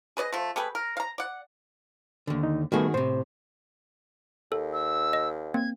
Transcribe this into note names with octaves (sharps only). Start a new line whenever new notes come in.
G#4 B4 D5 D#5
F3 A3
A3 G4 G#4 B4
A#4
F5 A#5
D5 F#5
D#2 D3
D#4
D#3 G3 A3 B3 F#4 G#4
A2 C3 C5
D#2 A4
E6
D#5
A#3 C4 G#6